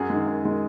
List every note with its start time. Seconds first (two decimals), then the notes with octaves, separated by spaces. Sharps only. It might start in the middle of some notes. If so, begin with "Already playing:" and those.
Already playing: F#2 F#4 G#4
0.10 D#3 G#3
0.26 F#2
0.43 D#3 G#3